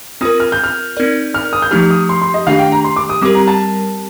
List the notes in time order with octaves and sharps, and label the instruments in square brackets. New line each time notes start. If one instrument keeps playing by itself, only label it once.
[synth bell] C4 F4 A#4 [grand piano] D#6
[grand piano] F6
G6
F6
[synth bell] C4 D#4 A#4 D5
[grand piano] F6
D#6
G6
[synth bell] F3 A3 D#4 G4 [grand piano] F6
[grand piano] D#6
C6
C6
D#5
[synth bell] D#3 A3 D4 G4 [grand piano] F5
[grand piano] G5
A#5
C6
D6
D#6
[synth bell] G3 C4 G4 A#4 [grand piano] D6
[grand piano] A#5
A5